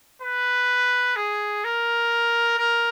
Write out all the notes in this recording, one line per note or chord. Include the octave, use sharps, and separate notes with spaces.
B4
G#4
A#4
A#4